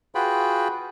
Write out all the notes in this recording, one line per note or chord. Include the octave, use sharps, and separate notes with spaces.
F4 F#4 G#4 B4 G5 B5